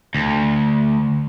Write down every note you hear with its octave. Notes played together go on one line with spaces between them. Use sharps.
D2